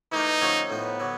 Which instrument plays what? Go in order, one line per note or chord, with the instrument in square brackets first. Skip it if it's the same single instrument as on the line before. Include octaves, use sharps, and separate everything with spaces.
[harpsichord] E3 A3 D4 G4 A#4 [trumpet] D#4
[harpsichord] D3 F3 A3 C#4
[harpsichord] A2 F3 A3 [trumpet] B3
[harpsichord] D3 F#3